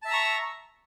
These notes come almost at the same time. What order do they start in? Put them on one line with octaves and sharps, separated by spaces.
A5 E5 E6 A#5 C#6